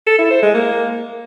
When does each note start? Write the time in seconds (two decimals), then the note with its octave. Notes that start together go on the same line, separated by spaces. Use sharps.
0.07 A4
0.19 E4
0.31 C5
0.43 G#3
0.54 A#3